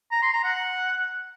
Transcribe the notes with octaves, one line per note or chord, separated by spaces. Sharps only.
A#5
C6
A#5
F#5